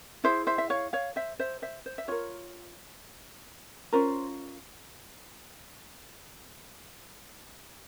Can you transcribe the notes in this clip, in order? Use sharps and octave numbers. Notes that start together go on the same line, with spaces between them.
E4 G#4 C5 E5
C5 E5
E5
C#5 F5
C#5 F5
C5 E5
C5 E5
C5 E5
C5
E5
F4 A#4 C#5
C#4 F4 A#4 C5